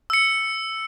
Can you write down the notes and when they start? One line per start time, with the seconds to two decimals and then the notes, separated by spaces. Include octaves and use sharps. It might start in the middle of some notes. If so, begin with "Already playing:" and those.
0.10 E6 C#7